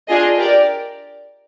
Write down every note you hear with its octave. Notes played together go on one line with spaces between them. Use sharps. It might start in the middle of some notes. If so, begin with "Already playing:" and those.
D4 F4 G#4 D#5
G4 A#4 D5